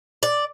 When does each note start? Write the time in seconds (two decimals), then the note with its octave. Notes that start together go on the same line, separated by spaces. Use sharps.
0.23 D5